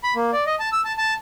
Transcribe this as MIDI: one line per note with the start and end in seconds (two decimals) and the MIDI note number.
0.03 0.14 83
0.15 0.31 58
0.33 0.44 74
0.46 0.55 75
0.60 0.69 81
0.72 0.81 88
0.85 0.93 81
0.98 1.14 81